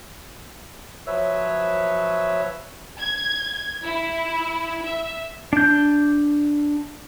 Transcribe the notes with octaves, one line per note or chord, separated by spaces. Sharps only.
F3 F#3 B4 C#5 E5 E6
G#6
E4
E5
D4 G6